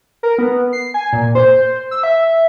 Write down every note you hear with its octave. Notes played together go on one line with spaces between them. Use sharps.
A#4
B3
C7
G#5
A#2
C5
E6
E5